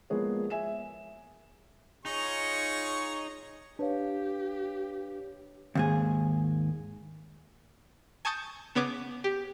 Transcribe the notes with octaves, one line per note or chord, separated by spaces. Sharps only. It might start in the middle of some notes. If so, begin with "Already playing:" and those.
F3 G#3 A#3 B3 G#4 C#5
E5 G#5 E7
D#4 F4 G#4 C#5 C#6
D4 G4 B4 C#5 F5
D#2 G#2 G#4
G#5 A5 C#6 D#6 G6 A6
C#3 B3 C#5 D6
G4